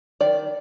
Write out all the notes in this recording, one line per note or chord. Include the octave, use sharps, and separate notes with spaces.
D#3 D5